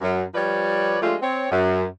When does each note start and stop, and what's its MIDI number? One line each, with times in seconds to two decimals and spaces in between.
0.01 0.23 42
0.34 0.97 53
0.34 0.97 55
0.34 0.97 71
0.34 0.97 73
0.34 0.97 74
1.02 1.15 53
1.02 1.15 56
1.02 1.15 57
1.02 1.15 62
1.02 1.15 65
1.02 1.15 67
1.21 1.51 60
1.21 1.51 73
1.51 1.84 42